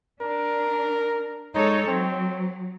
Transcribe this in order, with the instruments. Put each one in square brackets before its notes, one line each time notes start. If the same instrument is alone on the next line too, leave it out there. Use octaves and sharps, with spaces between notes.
[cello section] D4 [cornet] A#4
[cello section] G#3 A4 C#5 [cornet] D#4
[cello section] F#3 [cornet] C4